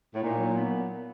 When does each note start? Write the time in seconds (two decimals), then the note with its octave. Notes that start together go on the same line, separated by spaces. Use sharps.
0.15 A2
0.22 A#2 D#4
0.38 F#3
0.56 B3